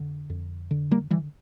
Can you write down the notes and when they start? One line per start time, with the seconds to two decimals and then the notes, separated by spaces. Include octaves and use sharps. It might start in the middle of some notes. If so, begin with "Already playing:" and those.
Already playing: F2 D3
0.30 F2
0.71 D3
0.91 G3 A#3
1.11 D3 E3 G3